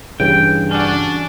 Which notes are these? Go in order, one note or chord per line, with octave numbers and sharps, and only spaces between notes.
G2 C#3 E3 G5
C#4 D4 F#4